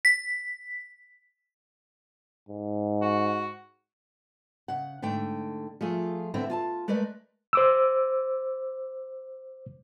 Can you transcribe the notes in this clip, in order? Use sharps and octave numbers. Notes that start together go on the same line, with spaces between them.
B6
G#2
F#4
C#3 F#5
G#2 D3 A3 G5
F3 A3 F4 G#4
D3 B3 C4 E4
F4 G#5 A5
G#3 A3 A#4 B4 D5
C5 D6 E6